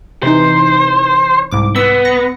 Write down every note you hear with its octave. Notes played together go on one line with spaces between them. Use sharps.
C3 E3 D#4 C5
C2 G#2 D6
B3 E6
A#6 C#7